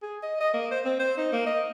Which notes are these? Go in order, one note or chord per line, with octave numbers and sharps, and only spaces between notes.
G#4
D#5
D#5
A#3
C5
C4
C5
D#4
A#3
D#5